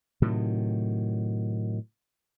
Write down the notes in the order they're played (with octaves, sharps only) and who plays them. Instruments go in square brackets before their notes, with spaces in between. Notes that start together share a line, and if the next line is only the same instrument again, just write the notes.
[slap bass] A2 C3 D#3 F#3